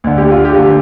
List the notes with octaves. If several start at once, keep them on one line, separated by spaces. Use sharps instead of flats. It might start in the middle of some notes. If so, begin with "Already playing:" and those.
D2 D3
G4
F4
G4
D2 D3